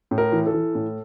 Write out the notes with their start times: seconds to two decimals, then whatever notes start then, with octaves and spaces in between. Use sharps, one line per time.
0.11 A2
0.18 A#4
0.32 E3
0.47 A4
0.53 E3
0.75 A2